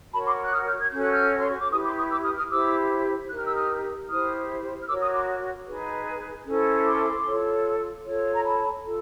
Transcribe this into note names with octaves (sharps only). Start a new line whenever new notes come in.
F#4 A#4 C#5 A5 B5
C6 D6
F#6
D#6 F6
F6 G6
G#6
C#4 F#4 A4 C#5 G6
F#6
F6 G6
C6
C#6
D6
E4 G4 B4 C#6 D#6
C6 D6
C#6 D#6
D6 E6
D#6 F6
D#6 F6
E4 G4 C5 D6 E6
D#4 G4 A#4 F#6
F6
E6
D#6 F6
E4 G4 C5 D#6 F6
F6
F#4 A#4 C#5 D6 E6
C#6 D#6
C6 D6
D#4 G#4 B4
C#4 E4 A4 C5
C6 D6
F4 A4 C#5
F4 A4 C#5
A#5
A5 B5
F4 A4